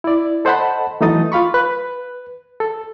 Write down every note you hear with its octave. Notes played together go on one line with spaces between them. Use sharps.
E4 D5
A4 C5 D#5 F#5 A5 B5
E3 F#3 A3 D#4 D#6 A6
F4 F5 B5 C#6
B4
A4